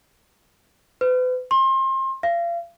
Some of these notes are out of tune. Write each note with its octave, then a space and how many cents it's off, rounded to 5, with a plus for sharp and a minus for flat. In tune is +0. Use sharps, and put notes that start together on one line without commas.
B4 +40
C6 +30
F5 -35